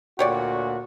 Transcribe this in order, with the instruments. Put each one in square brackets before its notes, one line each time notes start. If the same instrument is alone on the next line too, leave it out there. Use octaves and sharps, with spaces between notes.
[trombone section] D2 A#2 F#4 [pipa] G4 C#5 D5